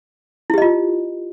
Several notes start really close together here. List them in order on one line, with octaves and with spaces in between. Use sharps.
E4 G4 D#5 F4